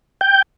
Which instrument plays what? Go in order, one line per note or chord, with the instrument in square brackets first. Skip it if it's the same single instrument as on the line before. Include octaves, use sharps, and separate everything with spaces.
[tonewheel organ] G5